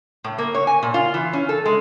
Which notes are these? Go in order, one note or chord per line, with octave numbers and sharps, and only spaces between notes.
A2
A#3
C#5
G#5
A#2
F4
E3
C#4
A4
G#3